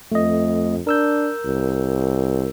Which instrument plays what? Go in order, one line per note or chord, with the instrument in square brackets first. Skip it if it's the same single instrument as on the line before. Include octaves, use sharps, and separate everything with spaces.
[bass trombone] F2 [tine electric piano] A3 D#5
[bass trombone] D4 [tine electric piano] A#4 E6 G6
[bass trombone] C2